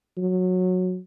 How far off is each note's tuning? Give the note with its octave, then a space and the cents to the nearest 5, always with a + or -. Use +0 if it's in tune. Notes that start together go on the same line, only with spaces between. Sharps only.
F#3 -15